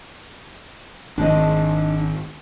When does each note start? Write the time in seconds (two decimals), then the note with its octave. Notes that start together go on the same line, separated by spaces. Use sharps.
1.18 G#1 D4 D#5